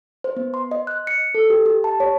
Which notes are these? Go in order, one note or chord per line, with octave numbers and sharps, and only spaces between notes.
C5
B3
C6
D#5
F#6
C#7
A4
G4
G4
A5
C#5